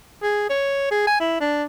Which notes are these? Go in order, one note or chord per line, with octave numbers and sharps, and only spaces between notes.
G#4
C#5
G#4
G#5
E4
D4